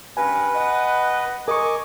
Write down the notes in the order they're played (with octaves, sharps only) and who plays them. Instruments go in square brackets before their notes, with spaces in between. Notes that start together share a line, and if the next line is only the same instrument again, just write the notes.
[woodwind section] G2 C#4 A#4 [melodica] B4 [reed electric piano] G#5
[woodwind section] D#5 F#5
[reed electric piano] A#4 C#6 [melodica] D#5 D6 [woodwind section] G#5